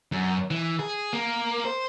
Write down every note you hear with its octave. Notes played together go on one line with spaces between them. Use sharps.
F#2
E3
G#4
A#3
C5